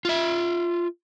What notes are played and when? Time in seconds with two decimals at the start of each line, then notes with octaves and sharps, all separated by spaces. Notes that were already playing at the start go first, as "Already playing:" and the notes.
0.05 F4 E5